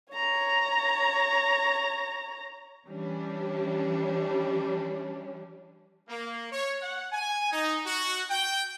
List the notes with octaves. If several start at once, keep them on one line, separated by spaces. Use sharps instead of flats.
C#5 A#5
E3 G3 C#4 D4
A#3
C#5
F#5
G#5
D#4
F#4
G5